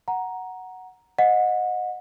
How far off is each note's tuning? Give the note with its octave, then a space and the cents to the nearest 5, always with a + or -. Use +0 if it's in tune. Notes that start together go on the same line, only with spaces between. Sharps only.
F#5 +0 A#5 +5
D#5 +0 F#5 -30